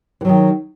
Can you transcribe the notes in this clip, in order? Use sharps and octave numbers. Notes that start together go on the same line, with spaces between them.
D#3 E3 F#3